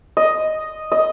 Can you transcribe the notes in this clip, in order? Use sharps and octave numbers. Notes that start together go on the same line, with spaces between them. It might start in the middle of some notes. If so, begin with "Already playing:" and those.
D#5
D#5